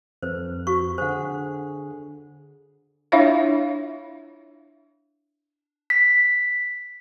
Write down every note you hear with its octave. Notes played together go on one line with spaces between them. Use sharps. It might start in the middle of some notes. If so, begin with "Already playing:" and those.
F2 B4 C5
F4 F#4 C#6
D3 G#4 C5 F#5
D4 E4 F4 C#5 E5 F5
B6